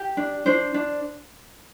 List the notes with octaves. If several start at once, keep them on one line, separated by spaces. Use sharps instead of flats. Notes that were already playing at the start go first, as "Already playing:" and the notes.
Already playing: G4
D4
D4 C5
D4